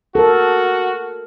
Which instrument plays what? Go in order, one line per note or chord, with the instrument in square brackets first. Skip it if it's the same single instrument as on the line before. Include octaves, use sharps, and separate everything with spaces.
[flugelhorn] F#4 [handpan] A4 A#4